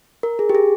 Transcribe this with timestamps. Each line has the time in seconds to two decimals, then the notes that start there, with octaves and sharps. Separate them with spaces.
0.23 A#4
0.39 G#4
0.49 G4
0.55 G#4